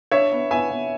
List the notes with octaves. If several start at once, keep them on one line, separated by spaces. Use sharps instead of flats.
D4 C#5 E5
B3
B3 E5 G#5
B3